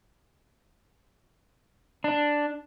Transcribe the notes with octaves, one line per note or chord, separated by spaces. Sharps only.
D4